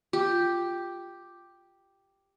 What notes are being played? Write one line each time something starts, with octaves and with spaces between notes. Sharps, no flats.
F4 G4